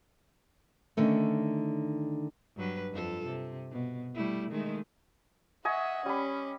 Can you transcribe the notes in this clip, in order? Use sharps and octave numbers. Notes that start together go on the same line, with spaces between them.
D3 D#3 A3 C#4
G2 F#3 B4
F2 F4 A4
C3
B2
G3 A3 E4
D#3 G#3 A3
D#5 E5 F#5 G#5 C#6
G3 C#4 B5